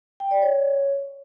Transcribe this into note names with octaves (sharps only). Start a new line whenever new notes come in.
G5
D5
C#5